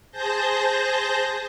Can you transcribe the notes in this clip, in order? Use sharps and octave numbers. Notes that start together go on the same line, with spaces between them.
G#4 C5 A5 G6 A#6